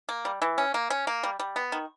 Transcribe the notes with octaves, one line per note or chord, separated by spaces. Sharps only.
A#3
G3
E3
C#4
A#3
C#4
A#3
G3
G3
B3
D#3